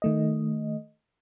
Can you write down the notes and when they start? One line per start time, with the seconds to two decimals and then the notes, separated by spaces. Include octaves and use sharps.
0.02 D#3 A3 D#5